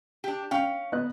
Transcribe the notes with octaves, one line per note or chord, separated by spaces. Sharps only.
D4 G4
C#4 F5 G5
B3 D#5 F#6